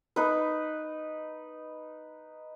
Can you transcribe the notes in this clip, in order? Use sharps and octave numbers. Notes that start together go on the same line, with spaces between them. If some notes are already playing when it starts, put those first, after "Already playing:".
D#4 B4